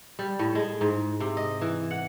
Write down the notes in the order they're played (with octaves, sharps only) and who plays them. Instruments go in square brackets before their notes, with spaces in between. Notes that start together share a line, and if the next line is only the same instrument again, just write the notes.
[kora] G3
A2
G#3
G#2
C3
D#5
E3
F#5